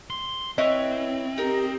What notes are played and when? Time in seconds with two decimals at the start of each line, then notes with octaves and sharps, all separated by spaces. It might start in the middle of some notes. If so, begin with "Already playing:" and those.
0.10 C6
0.58 C4 E4 B4 C#5 D#5
1.38 D#4 G4 A#4